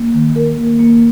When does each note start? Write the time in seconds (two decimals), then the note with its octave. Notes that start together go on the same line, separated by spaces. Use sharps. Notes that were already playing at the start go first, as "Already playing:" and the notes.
Already playing: A#3
0.14 D#3
0.36 D#3 A#4
0.57 A#3
0.79 A#3